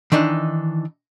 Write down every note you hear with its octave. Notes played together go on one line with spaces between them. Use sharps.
D#3 E3 D4 D#4